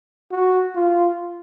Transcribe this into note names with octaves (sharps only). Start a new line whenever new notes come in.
F#4
F4